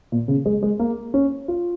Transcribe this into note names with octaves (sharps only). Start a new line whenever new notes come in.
A#2
C#3
G#3
G#3
A#3
C#4
F4